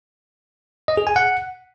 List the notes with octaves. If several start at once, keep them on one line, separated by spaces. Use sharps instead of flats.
D#5
G#4
G#5
F#5